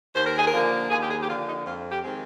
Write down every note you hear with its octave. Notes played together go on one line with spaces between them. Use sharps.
D#2 C5
A#4
G#4
A#4
D3 F3 A#3
D#2 G#4
G4
G#4
G4
D3 F3 A#3 F4
D#4
F2 F4
G4
D#3 G#3 C4